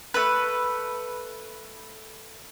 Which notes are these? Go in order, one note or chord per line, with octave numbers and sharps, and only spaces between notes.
A3 B4